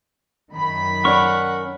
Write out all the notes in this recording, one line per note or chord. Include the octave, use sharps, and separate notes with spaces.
F#2 D#3 B5
C#4 A#4 C#5 D5 F#5 C#6